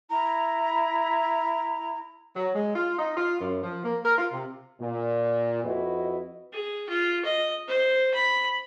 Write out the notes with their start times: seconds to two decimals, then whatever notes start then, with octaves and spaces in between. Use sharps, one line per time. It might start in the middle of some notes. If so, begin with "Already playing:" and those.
0.09 E4 A#5
2.36 F#3
2.55 G#3
2.75 F4
2.99 D#4
3.17 F4
3.41 F#2
3.63 F3
3.84 A#3
4.05 A#4
4.18 F4
4.33 C3
4.81 A#2
5.65 F2 E4 F#4 B4 D#5
6.53 G#4
6.89 F4
7.25 D#5
7.68 C5
8.14 B5